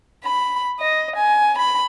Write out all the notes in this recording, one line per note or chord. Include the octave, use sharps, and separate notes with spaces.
B5
D#5
G#5
B5